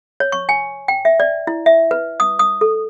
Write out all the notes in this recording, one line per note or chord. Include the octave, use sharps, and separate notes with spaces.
C#5
C#6
G#5
G5
E5
D5
E4
E5
B4
D#6
D#6
A4